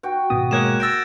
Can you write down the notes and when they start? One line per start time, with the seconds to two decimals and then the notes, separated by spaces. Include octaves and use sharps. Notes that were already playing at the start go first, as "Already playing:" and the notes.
0.03 F#4 G5
0.30 G#1 B2 D#6
0.51 G#3 A#3 C#5 F#6 G#6 E7
0.80 E6 G6 A6 A#6 D7